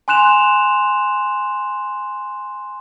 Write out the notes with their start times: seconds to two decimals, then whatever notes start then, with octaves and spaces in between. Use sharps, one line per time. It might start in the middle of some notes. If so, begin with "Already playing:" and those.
0.08 G#5 C6 F#6 E7 F7